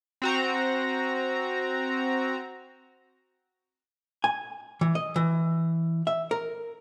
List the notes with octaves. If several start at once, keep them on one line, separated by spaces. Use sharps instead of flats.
C4 F#4 A#5
G#5
E3
D#5
E3
E5
A#4